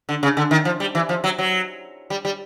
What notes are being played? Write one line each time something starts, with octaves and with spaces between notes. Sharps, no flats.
D3
C#3
D3
D#3
F3
G3
E3
F3
F#3
F#3
G3
G3